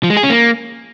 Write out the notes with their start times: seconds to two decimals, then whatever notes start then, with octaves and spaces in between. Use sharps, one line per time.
0.03 F3
0.10 G#3
0.17 G#4
0.23 C#4
0.30 A#3